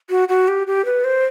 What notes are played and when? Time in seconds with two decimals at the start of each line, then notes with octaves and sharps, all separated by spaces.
0.10 F#4
0.29 F#4
0.48 G4
0.67 G4
0.85 B4
1.04 C5